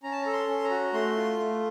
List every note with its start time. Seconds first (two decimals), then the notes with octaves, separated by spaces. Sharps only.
0.03 C#4 A#5
0.12 A5
0.22 A4 A#5
0.33 C6
0.48 C#4
0.64 A#5
0.70 F#4
0.93 A3 C6
1.16 F4
1.39 A3